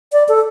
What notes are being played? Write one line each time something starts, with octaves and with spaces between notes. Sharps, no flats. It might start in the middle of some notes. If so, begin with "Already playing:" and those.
D5
A4